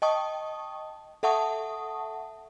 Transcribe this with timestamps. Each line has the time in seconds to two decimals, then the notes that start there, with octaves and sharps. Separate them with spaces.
0.02 D#5 G5 A5 C#6 D#6
1.23 A4 E5 F#5 A5 C#6 D#6